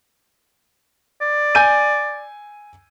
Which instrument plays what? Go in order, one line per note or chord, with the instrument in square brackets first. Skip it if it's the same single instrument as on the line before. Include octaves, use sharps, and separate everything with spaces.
[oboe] D5
[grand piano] G#5 G6 D#7